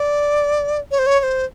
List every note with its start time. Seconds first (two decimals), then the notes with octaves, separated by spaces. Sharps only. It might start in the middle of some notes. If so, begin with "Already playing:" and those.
Already playing: D5
0.91 C#5
0.99 C5
1.07 C#5
1.20 C#5
1.23 C5